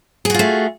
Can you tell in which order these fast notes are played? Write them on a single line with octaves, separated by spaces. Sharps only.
G#4 F#4 F4 A3